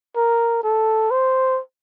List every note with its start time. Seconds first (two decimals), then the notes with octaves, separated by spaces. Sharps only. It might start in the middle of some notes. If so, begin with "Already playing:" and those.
0.16 A#4
0.64 A4
1.11 C5